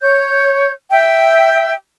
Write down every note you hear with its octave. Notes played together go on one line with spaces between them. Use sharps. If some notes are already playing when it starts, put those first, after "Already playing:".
C#5 G6
E5 G5